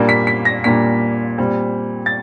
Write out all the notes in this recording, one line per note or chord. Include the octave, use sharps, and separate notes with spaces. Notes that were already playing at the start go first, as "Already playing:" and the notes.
Already playing: A#2 G3 A#3 D4
B6
B6
A#6
A#2 G3 A#3 D4 B6
A#2 G3 C4
A6